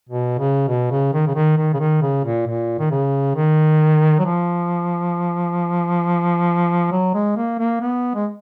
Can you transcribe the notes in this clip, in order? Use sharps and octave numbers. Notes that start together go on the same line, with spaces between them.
B2
C#3
B2
C#3
D#3
C#3
D#3
D#3
C#3
D#3
C#3
A#2
A#2
D#3
C#3
D#3
F#3
F3
F#3
G#3
A#3
A#3
B3
G#3